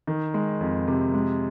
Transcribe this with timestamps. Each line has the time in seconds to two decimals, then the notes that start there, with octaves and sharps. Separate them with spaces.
0.07 D#3
0.34 G#3
0.61 F2
0.87 C3
1.14 G#3